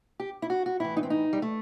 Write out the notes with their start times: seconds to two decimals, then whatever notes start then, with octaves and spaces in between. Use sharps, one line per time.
0.20 G4
0.42 E4
0.50 F#4
0.66 F#4
0.80 A2 E3 E4
0.97 D#4
1.03 C4
1.10 D#4
1.33 G3
1.42 A3